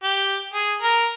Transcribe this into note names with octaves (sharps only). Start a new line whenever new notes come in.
G4
G#4
A#4